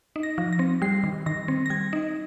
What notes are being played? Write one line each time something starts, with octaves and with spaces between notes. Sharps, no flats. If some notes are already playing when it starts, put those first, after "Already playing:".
D#4
A#6
F3
A#6
C4
G3 C7
D#3
D#3 A#6
C4
A#6
G3 G#6
D#4